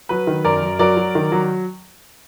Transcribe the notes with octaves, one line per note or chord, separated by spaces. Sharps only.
F#3 B4
D#3
F#2 A#4 D5
F#2
F#3 A#4 D5
F#3
D#3
F#3